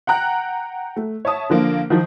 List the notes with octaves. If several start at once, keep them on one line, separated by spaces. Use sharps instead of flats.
F#5 G5 A#5 F#6
A3
C#5 E5 A5 D#6
D3 F3 A#3
D#3 F3